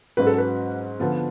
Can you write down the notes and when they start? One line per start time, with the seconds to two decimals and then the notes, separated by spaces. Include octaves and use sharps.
0.17 G#2 F#3 C#4 F#4 B4
0.27 A4
0.38 B4
1.00 D3 F3 B3 F4